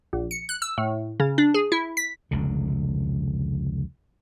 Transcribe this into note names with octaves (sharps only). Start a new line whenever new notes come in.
A#1
C#7
F#6
E6
A2
C#3
D4
G#4
E4
B6
F1 C#2 D3